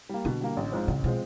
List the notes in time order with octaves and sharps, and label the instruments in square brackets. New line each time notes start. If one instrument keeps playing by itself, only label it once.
[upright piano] G3 A#3
[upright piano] B2 [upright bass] D3
[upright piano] G3 A#3
A1
G#2 F3 G#3 C4
[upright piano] A1 [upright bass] C#3
[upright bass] B2 [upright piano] F3 G#3 C4